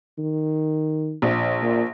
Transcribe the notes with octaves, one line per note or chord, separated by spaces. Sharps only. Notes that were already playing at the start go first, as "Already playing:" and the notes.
D#3
A#1
A#2